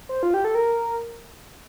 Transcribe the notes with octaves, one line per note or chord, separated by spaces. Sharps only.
C5
F4
G4
A4
A#4